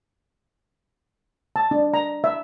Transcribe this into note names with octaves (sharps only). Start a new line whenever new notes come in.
A5
D4
A#5
E5